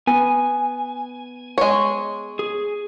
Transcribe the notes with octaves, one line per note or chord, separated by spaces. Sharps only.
B3 G#5
G#3 C#5
G#4